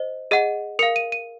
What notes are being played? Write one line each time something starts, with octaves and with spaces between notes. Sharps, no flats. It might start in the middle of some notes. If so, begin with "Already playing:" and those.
Already playing: C5 D#5
G#4 D#5 F#5
A#4 F5 C#7
D#7
D#7